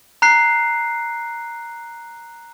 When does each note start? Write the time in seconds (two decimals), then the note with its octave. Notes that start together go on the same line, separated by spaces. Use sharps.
0.22 A#5 F#6 C7